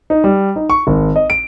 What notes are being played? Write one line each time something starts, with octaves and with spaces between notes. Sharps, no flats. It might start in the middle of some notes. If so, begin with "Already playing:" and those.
D#4
G3
D#4
C#6
G#1
D#5
D7